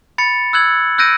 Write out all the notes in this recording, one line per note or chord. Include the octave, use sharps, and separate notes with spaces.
B5 A6 C#7
E6 F#6 G#6 F#7
E6 F#6 G6 A#6 D7 D#7